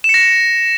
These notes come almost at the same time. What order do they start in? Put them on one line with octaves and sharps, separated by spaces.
E7 C#7 A#6